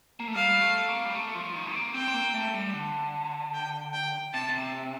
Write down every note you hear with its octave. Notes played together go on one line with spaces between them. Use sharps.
A#3
A3
G3 F5
A3
A#3
G3
A3
F3
D#3
A#3
C4 G5
C4
A#3
A3
G3
D3
G5
G5
C3 A5
C3